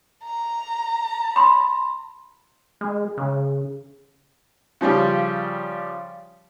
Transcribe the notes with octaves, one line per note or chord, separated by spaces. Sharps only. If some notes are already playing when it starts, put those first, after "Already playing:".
A#5
B5 C6
G#3
C#3
C#3 F3 G3 G4